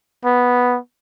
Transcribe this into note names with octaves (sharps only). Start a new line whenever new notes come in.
B3